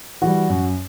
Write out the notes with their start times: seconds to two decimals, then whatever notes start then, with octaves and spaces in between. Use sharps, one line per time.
0.22 E3 G3 F#4
0.50 F#2